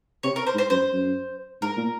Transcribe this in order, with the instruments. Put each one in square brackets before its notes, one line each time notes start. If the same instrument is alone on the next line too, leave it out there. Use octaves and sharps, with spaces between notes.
[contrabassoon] C3 [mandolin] C#5
[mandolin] A#4
C5
[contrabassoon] G#2
[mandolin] C5
[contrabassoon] F#2 [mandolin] C5
[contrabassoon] F#2
[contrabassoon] G#2 [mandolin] A#4
[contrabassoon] A#2